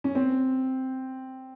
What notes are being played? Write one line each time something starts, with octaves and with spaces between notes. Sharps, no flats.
C#4
C4